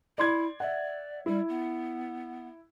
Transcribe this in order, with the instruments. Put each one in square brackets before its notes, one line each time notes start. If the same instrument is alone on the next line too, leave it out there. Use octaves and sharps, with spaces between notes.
[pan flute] E4 [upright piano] D5 C6 G#6
[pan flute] D5 [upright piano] E5 F#5
[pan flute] G3 [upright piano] E4
[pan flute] B3